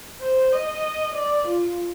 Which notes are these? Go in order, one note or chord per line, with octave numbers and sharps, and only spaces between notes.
C5
D#5
D5
F4